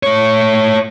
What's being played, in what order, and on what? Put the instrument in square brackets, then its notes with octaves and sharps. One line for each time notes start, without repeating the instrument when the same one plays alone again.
[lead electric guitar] A3 C#5